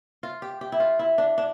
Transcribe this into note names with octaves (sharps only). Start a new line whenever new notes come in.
F4
G4
G4
E4
F4
E4
D4
D4